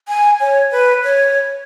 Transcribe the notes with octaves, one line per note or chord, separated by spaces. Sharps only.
G#5
C#5
B4
C#5